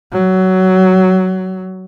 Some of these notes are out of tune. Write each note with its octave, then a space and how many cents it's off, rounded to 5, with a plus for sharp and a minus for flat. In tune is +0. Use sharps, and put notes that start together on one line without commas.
F#3 +15